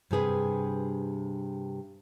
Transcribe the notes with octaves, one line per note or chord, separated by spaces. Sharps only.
G2 C3 G#4 B4